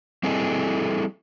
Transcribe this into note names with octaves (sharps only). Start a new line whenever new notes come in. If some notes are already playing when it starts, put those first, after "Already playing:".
G3 C4 E4 G#4 A4 D#5